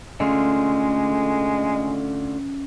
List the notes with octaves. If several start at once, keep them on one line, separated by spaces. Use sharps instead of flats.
D3 G#3 A3 C#4 F4